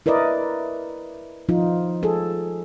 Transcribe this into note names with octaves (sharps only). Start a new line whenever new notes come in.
E4 A#4 B4 D5 D#5
F3 D#4 F4
G#4 A4